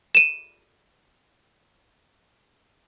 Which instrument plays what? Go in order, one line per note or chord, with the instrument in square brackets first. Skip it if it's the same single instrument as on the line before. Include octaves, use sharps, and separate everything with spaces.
[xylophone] D#7 E7